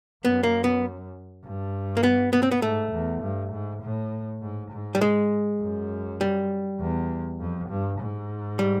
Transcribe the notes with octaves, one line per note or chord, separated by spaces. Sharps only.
F#2 B3
A#3
B3
G2
A#3
B3
B3
C4
B3
G#2 A3
E2
G2
G#2
A2
G#2
G#2
G3
G#3
F#2
G3
E2
F2
G2
G#2
G3